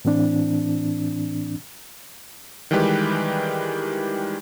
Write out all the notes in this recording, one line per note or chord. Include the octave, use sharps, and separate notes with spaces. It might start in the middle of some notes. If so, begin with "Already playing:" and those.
A2 E3 C4 D4
D#3 E3 G3 G#3 G4 B4